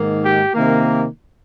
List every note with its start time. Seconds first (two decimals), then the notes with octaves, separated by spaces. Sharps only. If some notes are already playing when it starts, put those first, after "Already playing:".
Already playing: G#2 D#3 A#3
0.21 G4
0.53 C3 D#3 A#3